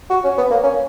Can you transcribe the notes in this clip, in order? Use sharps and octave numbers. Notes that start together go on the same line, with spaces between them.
F#4
C#4
B3
A#3
C#4